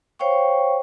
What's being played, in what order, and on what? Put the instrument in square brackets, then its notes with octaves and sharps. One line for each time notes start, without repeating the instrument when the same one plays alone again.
[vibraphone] C5 C#5 F5 G5 C#6